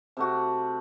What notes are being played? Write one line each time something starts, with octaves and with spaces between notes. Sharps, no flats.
C3 A3 F#4